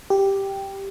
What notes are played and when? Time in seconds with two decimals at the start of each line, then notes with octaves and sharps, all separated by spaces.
0.10 G4